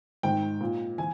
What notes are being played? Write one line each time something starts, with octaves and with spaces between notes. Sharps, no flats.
G#2 D#3 G5
A#2
E3 G#5